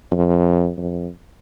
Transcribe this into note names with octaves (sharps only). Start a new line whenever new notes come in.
F2
F2